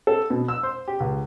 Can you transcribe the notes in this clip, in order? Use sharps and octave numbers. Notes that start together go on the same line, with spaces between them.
A4
B2
E6
C5
G4
C#2